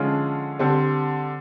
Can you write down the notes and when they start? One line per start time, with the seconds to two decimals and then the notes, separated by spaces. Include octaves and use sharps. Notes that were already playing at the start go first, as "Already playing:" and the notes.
Already playing: D3 F3 G#3 C#4 F4
0.59 D3 G3 C4